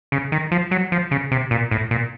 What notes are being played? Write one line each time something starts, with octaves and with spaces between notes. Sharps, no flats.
C#3
D#3
F3
F#3
F3
C#3
C3
A#2
A2
A#2